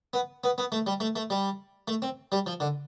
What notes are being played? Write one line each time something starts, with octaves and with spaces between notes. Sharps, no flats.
B3
B3
B3
A3
G3
A3
A3
G3
A3
C4
G3
F3
D3